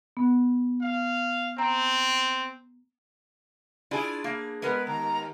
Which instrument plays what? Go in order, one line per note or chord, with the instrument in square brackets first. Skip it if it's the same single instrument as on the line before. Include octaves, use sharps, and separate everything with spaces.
[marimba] B3
[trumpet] F5
[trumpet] C4 [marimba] A#5
[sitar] D4 G#4 [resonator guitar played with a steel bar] E4 F4
[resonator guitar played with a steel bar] A#3
[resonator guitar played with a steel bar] G#3 B3 A#4 [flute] B4
[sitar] D#2 [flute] A#5